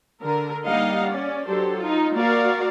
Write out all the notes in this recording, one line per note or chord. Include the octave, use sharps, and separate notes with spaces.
D3 A#4
G3 A#3 D#4 D#5 F5 F#5
C#4 D5
F#3 D4 G4 A4 C5
D#4 F4
A#3 F#4 A#4 D5 F5